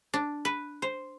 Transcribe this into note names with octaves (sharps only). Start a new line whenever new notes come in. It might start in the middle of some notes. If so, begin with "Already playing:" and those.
D4
B4
C5